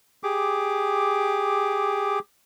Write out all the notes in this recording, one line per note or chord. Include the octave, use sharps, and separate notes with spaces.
G4 G#4 D6